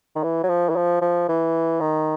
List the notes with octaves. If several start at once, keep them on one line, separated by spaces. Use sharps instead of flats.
D#3
E3
F#3
F3
E3
F3
F3
E3
D#3